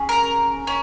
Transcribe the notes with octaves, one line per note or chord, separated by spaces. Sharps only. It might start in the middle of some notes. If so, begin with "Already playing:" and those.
Already playing: C#4 G#4
A#4
C#4